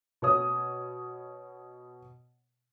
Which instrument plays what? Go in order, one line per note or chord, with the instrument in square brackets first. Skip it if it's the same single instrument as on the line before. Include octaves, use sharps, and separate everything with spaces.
[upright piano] B2 C#5 D#6